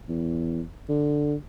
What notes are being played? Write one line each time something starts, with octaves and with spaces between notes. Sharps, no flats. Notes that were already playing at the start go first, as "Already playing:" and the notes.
E2
D3